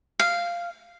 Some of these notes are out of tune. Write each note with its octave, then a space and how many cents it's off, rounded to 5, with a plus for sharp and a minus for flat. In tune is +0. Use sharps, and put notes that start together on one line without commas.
F5 -10